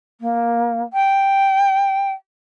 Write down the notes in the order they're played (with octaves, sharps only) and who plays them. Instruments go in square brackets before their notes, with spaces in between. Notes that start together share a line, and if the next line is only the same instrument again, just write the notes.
[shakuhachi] A#3
G5